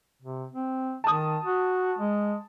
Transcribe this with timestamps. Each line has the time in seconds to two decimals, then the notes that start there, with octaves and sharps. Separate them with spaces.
0.22 C3
0.54 C4
1.04 D#3 A5 D#6
1.44 F#4
1.99 G#3